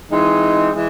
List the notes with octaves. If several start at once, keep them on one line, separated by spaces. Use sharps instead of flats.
E3 G#3 C4 D#4
E3 G#3